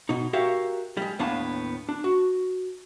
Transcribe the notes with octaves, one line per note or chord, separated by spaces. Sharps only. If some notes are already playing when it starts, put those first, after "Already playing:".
B2 D#4
F#4 G4 A#4 C#5 E5 F5
G3 G#3
D#2 A2 B3 D4 F5 A5
D4
F#4